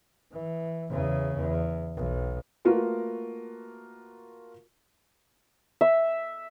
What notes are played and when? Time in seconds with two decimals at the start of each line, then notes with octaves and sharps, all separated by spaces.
0.32 E3
0.89 E2 C#3
1.37 E2
1.95 B1
2.65 A3 A#3 F4 F#4 A#4 B4
5.81 E5